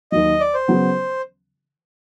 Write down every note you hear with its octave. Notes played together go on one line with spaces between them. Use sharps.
D#2 D#3 F#3 D#5
D5
C5
C#3 F#3 B3